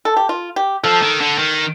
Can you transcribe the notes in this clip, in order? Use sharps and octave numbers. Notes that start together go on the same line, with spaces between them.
A4
G4
F4
G4
F3 A4
D#3
D3
D#3